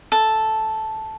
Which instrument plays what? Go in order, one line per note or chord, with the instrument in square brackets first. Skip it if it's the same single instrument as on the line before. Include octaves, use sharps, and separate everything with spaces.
[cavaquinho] A4